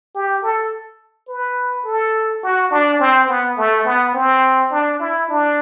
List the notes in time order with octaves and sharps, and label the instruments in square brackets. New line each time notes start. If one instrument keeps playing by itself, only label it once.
[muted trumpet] G4
A4
B4
A4
F#4
D4
C4
B3
A3
B3
C4
D4
E4
D4